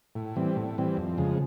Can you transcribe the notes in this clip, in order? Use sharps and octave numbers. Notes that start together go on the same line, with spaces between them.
A2
E3 G3 C4
A2
E3 G3 C4
F2
C#3 F3 G#3